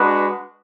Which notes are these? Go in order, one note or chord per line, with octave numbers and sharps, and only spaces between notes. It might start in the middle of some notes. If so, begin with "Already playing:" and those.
Already playing: G#3 D4 F#4 B4